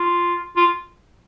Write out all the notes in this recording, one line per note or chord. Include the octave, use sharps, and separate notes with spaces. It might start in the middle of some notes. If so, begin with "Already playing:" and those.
Already playing: F4
F4